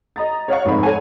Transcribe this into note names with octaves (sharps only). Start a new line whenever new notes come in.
D#5 A#5 A6
C#5 F5 F#5 C#6
F1 G#2 C4 D#4 B5
A4 C#5 F#5 G#5